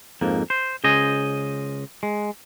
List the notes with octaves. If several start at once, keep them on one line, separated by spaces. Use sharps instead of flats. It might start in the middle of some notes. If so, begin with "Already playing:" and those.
F2 G#2 A#3
C5
C#2 C#3 C5 D#5 G#5
G#3